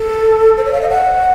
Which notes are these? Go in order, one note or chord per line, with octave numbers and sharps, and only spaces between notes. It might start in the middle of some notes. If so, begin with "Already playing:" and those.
Already playing: A4
C5
C#5
F5
D#5
F#5